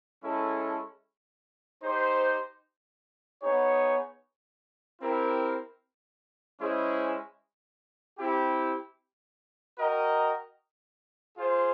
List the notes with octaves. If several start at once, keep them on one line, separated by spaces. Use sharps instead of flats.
G#3 C#4 E4 A4
D#4 G4 C5
B3 D#4 G#4 C#5
C4 E4 G4 A#4
G#3 C#4 E4 G#4 C5
C4 E4 G4
F#4 A#4 D#5 G5
F4 G#4 C5